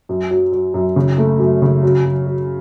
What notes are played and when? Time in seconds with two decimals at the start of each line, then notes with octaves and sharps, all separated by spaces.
0.09 F#2
0.31 F#3
0.52 F#3
0.74 F#2
0.96 C#3
1.18 A3
1.39 F#2
1.62 C#3
1.83 F#3
2.05 F#2
2.27 F#3